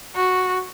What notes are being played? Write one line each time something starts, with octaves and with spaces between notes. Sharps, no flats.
F#4